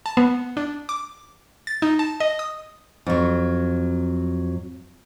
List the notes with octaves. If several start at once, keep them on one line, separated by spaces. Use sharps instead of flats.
A5
B3
D4
D6
A6
D#4
A5
D#5
D#6
F2 F#3